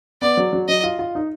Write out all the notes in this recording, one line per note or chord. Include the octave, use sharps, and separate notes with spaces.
B3 D5
F#3
F#3
F#3 D#5
F4
F4
D#4